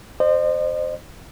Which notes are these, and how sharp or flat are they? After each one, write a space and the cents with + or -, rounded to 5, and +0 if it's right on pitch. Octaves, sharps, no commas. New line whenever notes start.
C5 +0 D#5 -40